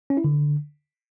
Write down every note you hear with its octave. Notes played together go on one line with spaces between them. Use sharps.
C#4
E4
D3